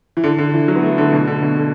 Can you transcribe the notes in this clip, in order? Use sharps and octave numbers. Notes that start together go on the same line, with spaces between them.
E3
D3
D3
E3
F#3
B3
A3
D3
B2
D3
B2
D3